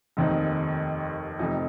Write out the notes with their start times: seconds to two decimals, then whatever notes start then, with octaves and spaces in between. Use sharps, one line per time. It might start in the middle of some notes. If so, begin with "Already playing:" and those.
0.17 F1 D#2 D#3 C4 D#4
1.39 F1 F2 C3 F3 D#4